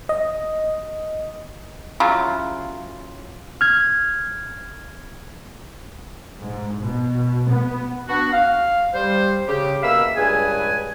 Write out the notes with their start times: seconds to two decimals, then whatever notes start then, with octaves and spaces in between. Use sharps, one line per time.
0.09 D#5
2.00 C#3 F#3 E4 F4
3.61 F6 G#6
6.41 G#2
6.80 B2
7.50 B3
8.08 B3 D4 F#4
8.33 F5
8.94 G3 C5
9.47 C#3 G4
9.82 B2 A#3 E5 F5 B5 E6
10.16 C#2 G2 G#4 B4 G#5